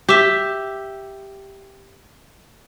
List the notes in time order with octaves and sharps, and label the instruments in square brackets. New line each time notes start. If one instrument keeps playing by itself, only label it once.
[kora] G4 E5